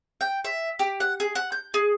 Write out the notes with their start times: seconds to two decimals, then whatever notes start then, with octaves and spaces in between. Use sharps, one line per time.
0.21 G5
0.44 E5
0.79 G4
1.00 F#5
1.20 G#4
1.35 F#5
1.52 G6
1.74 G#4